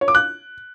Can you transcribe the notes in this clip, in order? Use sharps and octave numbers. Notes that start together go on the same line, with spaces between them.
C#5
D6
F#6